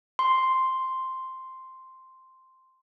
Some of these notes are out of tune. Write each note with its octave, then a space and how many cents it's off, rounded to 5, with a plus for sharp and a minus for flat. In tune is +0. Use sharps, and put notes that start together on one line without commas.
C6 +0